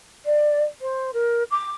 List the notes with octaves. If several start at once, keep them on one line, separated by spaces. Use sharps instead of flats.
D5
C5
A#4
D6